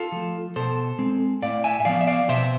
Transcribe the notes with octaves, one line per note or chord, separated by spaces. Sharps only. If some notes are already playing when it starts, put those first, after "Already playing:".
Already playing: F4 A4
F3 A3
B2 A4 C5
G#3 C4
A2 D5 F5
E5 G#5
E5
F3 B3 D5 F5
E5
D5 F5
B2 C5 E5